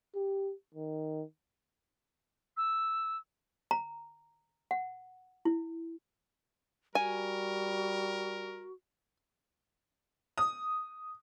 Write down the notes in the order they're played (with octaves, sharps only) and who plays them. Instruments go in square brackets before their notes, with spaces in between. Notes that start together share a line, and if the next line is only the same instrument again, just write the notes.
[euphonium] G4
D#3
[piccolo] E6
[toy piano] A#5
F#5
E4
[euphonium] G3 [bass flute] F#4 [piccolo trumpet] A#4 [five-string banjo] G#5
[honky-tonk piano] D#6